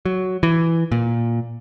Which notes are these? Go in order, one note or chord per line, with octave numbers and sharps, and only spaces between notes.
F#3
E3
A#2